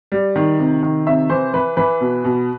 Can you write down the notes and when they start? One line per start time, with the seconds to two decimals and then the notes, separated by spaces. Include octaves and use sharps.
0.12 G3
0.36 D#3
0.59 C3
0.83 D#3
1.06 C3 E5
1.30 E3 C5
1.54 E3 B4
1.77 E3 B4
2.01 B2
2.24 B2